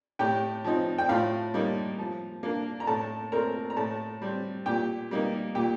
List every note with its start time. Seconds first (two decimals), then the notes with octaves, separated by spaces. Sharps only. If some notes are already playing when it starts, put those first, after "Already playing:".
0.19 A2 G4 G5
0.64 F3 C4 D#4
0.98 G5
1.09 A2 F4 F5
1.54 G3 A#3 D#4
1.99 F3
2.43 A#3 D4
2.80 A#5
2.87 A2 A4 A5
3.32 A3 C4 A#4 A#5
3.70 A#5
3.77 A2 A4 A5
4.22 G3 C4
4.66 A#2 G4 G5
5.11 G3 A#3 D#4
5.55 A#2 G4 G5